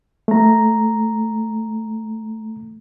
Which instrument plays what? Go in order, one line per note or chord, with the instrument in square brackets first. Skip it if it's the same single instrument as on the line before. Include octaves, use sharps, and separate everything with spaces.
[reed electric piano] A3 A#5